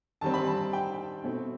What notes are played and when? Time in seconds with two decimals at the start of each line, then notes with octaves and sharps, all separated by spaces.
0.21 D#3 G3 C4 A5
0.34 B5
0.47 A5
0.73 G5
1.23 B2 A3 C4